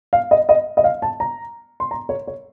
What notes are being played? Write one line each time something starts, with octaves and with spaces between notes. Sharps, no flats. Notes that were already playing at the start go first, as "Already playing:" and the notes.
F5
D#5
D#5
D#5
F5
A5
A#5
C6
A#5
C#5
C#5